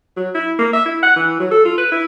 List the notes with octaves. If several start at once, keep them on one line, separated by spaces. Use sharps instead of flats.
F#3
E4
A#3
E5
E4
F#5
E3
F#3
A4
F4
B4
E4